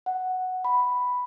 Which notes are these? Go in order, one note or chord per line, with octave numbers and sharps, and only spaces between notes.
F#5
B5